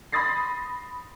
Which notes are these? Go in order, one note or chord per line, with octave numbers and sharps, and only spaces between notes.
B5 C6 D#6 A6 A#6 C7